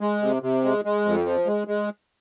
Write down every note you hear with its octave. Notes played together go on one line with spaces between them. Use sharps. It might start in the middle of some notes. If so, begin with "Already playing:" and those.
G#3
C3
C3
G#3
G#3
F2
F3
G#3
G#3